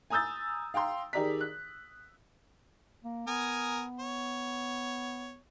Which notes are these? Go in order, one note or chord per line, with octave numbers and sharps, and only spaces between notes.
G#5 A#5 D#6 E6 G6 A6
F5 G5 A#5 C6
D#3 G4 G#4 D5 A#5 B6
F#6
A#3
B3 A#4 G#5 D#6
C#5